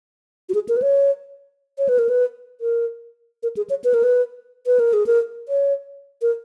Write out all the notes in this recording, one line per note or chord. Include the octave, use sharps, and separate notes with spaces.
F#4
G#4
A#4
B4
C#5
C#5
B4
A#4
B4
A#4
A#4
G#4
C#5
B4
A#4
B4
B4
A#4
G#4
A#4
C#5
A#4